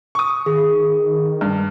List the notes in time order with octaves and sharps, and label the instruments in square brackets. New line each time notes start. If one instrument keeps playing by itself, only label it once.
[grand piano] C#6 D#6
[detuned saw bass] D#3 [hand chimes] G#4
[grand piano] G2